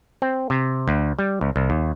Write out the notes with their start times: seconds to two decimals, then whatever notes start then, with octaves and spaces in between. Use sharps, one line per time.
0.22 C4
0.50 C3
0.88 D2
1.19 G3
1.41 C#2
1.56 C2
1.70 D#2